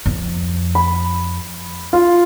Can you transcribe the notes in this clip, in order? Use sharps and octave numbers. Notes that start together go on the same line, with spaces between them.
F2
B5
F4